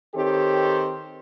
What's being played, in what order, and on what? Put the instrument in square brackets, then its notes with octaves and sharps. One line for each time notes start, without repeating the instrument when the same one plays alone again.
[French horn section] D#3 C4 G4 A4 C#5